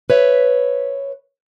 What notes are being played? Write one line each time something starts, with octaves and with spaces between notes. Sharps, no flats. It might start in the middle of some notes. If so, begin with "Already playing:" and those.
B4 C#5 E5